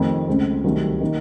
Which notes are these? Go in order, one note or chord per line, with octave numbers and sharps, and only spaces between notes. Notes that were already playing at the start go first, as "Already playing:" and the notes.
Already playing: F1 F2 D#3 A3
C#2 C#3 A3 C4
C2 C3 D#3 F#3 A3
D#3 A#3 D#4